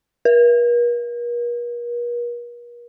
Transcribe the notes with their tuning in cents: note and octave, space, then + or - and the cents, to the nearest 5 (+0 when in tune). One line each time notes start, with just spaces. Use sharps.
A#4 +45